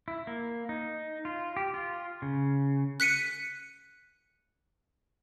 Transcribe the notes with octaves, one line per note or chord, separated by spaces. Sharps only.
E4
A#3
D#4
F4
G4
F4
C#3
F#6 B6 C#7 D#7